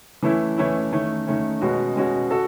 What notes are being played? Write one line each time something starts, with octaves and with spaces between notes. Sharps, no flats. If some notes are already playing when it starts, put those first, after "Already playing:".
E3 A3 C#4 E4
E3 A3 C#4 E4
D#3 A3 C#4
D#3 A3 C#4
B2 G#3 C#4 F#4
B2 G#3 C#4 F#4
F#4 A4